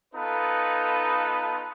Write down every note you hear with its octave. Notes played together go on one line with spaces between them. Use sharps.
B3 D#4 F4 A4 B4